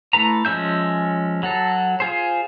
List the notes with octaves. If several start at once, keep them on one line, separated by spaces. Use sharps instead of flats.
A3 E4 B4 A#5
F3 G#3 C#4 E5 G6
F#3 F#4 A4
F4 G#4 C5